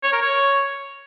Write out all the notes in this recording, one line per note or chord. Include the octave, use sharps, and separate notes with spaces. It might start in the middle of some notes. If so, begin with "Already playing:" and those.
C#5
A#4
C#5